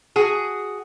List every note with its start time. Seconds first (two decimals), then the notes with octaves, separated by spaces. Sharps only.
0.16 F#4 G#4